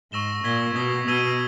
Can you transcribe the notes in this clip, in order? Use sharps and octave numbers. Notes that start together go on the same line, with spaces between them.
G#2 C#6 E6 A#6 E7 G7
A#2 G#6 B6 G7
B2 D#6 G#6 B6 G7
B2 E6 G#6 D#7 G7